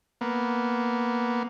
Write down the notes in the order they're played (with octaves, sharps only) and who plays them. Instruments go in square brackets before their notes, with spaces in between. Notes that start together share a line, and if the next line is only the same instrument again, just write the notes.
[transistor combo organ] A#3 B3